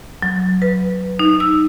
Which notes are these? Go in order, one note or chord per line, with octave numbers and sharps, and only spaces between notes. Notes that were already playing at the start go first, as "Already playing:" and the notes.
F#3
B4
D#4
E6